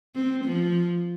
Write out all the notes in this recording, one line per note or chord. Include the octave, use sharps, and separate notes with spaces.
C4
F3